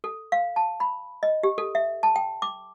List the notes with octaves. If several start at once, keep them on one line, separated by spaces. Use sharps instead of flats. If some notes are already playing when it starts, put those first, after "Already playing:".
A4
F5
A5
B5
D#5
G4
A4
E5
A5
G5
D6